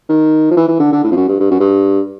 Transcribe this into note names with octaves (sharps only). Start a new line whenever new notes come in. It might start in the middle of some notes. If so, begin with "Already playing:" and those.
D#3
F3
E3
E3
D3
D3
A2
F2
F#2
G2
G2
F#2
G2